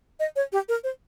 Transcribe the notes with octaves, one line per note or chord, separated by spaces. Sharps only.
D#5
C#5
G4
A#4
C5